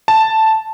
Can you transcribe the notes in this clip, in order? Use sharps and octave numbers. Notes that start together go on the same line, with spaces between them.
A5